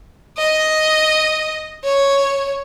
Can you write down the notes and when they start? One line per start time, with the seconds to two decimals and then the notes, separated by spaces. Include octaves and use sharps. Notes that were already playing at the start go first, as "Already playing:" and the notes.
0.38 D#5
1.84 C#5